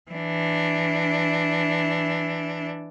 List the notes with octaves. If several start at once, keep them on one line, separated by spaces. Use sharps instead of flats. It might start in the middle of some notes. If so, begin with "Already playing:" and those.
E3 D4